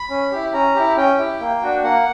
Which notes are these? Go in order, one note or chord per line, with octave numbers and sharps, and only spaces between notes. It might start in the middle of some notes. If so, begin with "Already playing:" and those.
Already playing: B5
C#4
E4 G4
C#4 A#5
E4 G4
C#4 G5
E4 G4
A#3
D4 F#4
A#3 F#5